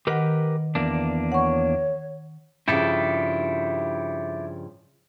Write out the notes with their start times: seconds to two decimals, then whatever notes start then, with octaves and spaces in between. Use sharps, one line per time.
0.07 D#3 G4 A#4 B4 F#5
0.75 E2 A#3 D4
1.32 C#5 F#5 C#6
2.68 G2 C#3 F3 E4 G4 A4